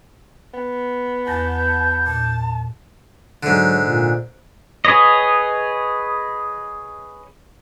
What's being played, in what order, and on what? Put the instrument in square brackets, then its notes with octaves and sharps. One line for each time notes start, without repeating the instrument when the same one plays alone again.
[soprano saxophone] B3
[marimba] E2 A6 A#6 [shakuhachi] A5 [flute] G6
[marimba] A#2 [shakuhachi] A5
[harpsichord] G#2 D3 [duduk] F#3
[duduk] A#2
[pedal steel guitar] G#4 B4 C#5 D#5